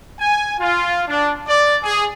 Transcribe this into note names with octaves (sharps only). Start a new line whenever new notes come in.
G#5
F4
D4
D5
G#4